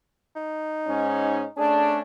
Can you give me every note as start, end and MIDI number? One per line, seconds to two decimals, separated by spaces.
0.36 1.52 63
0.87 1.43 44
0.87 1.43 61
1.58 2.00 57
1.58 2.00 61
1.58 2.00 62
1.58 1.91 68
1.58 1.99 81